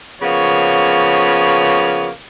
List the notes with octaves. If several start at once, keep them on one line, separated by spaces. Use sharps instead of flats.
C#3 F3 A#3 B3 C#5